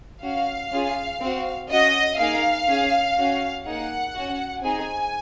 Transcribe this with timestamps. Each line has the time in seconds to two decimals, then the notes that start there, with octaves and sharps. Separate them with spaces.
0.22 C#4 F#4 F5
0.71 C#4 F4 G#4
1.20 C4 F#4
1.69 C#4 F#4 D#5
2.18 A#3 D#4 G#4 F5
2.67 C#4 G#4
3.17 C#4 F#4
3.65 A#3 D#4 G#4 F#5
4.14 C#4 F#4
4.63 C4 D#4 G#4 G#5